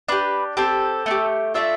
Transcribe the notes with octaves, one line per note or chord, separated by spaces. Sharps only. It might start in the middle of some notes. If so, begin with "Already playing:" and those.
D4 G4 B4
C4 G4 A4
A3 D4 G4
A3 D4 F4 E5